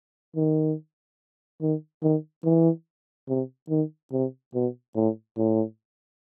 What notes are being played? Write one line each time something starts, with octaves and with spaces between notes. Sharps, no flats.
D#3
D#3
D#3
E3
C3
D#3
C3
B2
A2
A2